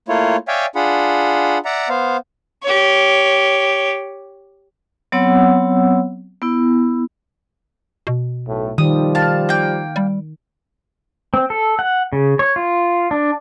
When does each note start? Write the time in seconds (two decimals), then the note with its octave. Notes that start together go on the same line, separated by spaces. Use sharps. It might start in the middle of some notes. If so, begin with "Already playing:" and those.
0.09 A3 A#3 E4 F4 C#5
0.48 C#5 D5 E5 F5 G5 G#5
0.76 D4 F4 G#4 F#5 B5
1.65 D5 E5 F#5 A#5
1.89 B3 C5 F5
2.63 G4 C#5
5.12 F#3 B3 C4 C#5 F#5 E6
6.42 B3 E4
8.07 B2
8.47 B1 A2 A3
8.78 D#3 F3 G3 D#6
9.15 F5 A5
9.49 A#3 G5
9.96 G3
11.34 C4
11.50 A4
11.79 F#5
12.13 C#3
12.39 C#5
12.56 F4
13.11 D4